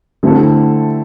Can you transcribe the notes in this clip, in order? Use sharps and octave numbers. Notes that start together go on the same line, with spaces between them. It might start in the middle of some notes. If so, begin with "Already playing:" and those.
D3 A3 C4 E4 A4